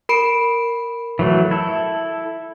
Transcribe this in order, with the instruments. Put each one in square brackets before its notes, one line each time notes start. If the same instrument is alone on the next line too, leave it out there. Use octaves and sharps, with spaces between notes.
[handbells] A#4 B5 D7
[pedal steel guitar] E3 F#3 A3
E4 A4